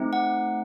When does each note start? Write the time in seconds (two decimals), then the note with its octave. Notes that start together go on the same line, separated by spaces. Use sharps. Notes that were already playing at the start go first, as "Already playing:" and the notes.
Already playing: A3 C4 D#4
0.13 F#5